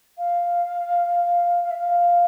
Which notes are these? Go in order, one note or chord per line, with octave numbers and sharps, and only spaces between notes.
F5
F5
E5
F5